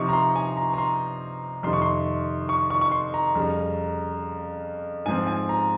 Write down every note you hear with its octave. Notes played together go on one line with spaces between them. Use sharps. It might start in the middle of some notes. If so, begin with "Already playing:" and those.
Already playing: C3 F3 C4 D#4 C#6
A#5
C6
G#5
A#5
A#5
C6
F2 C3 D#3 C6
C#6
C6
C#6
C#6
C#6
C6
A#5
F2 C#3 G3
G#2 F3 C4 G#5
G#5
A#5